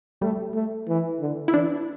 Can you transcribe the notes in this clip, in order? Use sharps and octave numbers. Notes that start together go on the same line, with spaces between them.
G3 A3
A3
E3
D3
E4
E3 D4